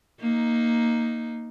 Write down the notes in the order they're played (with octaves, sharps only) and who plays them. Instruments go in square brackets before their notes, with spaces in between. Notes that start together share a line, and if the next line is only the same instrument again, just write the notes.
[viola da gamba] A#3 D#4